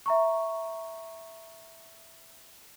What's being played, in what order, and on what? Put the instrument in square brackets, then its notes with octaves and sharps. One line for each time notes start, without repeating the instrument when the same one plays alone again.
[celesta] E5 A#5 C#6